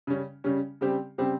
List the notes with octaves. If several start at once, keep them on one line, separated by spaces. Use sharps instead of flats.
C#3 G3 C#4
C#3 G3 C#4
C#3 G3 C4 G4
C#3 G3 C4 G4